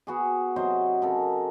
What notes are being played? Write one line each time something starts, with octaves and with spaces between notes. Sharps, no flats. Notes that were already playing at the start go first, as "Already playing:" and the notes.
B3 F#4 G#4
C3 F#3 C5 D#5
C#3 A4 A#4